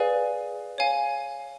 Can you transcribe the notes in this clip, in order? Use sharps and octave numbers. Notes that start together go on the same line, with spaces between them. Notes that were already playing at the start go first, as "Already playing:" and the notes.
Already playing: G#4 B4 D5 F5 G#5
C#5 F5 G#5